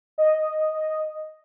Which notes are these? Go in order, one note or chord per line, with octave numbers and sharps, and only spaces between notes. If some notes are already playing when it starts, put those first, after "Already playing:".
D#5